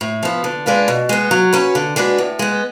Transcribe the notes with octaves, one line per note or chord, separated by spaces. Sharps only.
A2
F3 B3
D3
G#3 D4 F4 B4
B2
G#3 B3
F#3
C#4 F#4 B4
D3
G#3 D4 F#4 B4
A2
G#3 B3